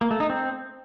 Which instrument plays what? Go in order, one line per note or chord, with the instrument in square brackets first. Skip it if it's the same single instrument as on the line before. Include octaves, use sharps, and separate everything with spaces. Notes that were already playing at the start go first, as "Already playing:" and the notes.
[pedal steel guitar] A#3
A3
D#4
C4